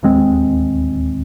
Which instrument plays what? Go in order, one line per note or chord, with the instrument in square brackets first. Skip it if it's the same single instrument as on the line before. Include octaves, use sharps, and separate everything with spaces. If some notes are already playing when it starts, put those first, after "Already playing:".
[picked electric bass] D1 D#2 G#3 C4